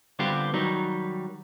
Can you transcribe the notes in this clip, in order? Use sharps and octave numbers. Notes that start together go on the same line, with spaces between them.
D3 G3 B3 C4 F4 G4
D#3 F#3 G3 D#4